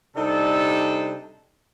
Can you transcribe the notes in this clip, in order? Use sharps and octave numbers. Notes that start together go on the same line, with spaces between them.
C3 G3 D4 D#4 A4